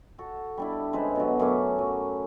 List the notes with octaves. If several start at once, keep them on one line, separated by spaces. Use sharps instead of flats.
F#4 A4
G3 D4 E4
C#3 G#3 B4 C5
B2 D3 F#3
F#2 A3 C#4 D6
F#3